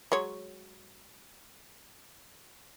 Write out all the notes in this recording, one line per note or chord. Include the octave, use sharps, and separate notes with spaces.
F#3 G#3 C#5